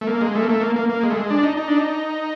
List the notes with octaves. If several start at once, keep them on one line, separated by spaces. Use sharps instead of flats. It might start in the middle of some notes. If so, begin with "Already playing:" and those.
A3
A#3
G#3
A3
A#3
A3
A#3
A#3
A#3
G#3
A3
G#3
D4
D#4
D#4
D4
D#4